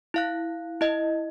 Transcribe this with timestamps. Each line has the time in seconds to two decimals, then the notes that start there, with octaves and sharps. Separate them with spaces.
0.14 E4 F5 F#6
0.81 E4 D#5